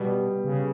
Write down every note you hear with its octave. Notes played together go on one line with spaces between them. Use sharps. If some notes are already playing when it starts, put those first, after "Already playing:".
Already playing: B2 G3 B3
C#3